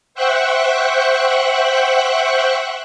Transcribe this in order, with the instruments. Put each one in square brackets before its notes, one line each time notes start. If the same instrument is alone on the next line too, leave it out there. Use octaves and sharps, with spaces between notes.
[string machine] C5 E5 F#5 G5 C#6 F#6